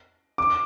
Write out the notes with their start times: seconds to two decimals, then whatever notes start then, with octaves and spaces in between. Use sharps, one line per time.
0.38 D6